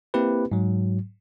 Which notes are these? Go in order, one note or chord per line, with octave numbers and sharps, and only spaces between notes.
A#3 C4 E4 G4 B4
G#2 F#3